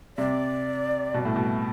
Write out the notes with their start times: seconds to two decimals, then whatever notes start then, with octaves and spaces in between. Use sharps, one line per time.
0.17 C3 D5
1.14 B2
1.25 A2
1.36 B2